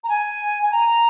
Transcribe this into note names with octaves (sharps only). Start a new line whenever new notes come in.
A#5
G#5
G#5
A#5